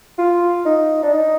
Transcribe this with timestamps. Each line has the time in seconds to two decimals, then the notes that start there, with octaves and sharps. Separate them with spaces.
0.18 F4
0.65 D#4
1.03 D4
1.13 D#4